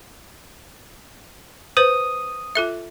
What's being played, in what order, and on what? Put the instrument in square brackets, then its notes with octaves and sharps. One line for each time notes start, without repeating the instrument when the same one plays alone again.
[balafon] B4 C5 [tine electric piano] D#6
[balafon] F4 A4 E5